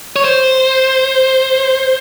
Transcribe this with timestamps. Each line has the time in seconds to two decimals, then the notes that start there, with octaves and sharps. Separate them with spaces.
0.16 C#5
0.24 C5